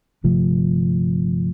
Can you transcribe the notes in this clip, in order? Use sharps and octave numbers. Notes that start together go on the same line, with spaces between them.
G1 C3 F3 A3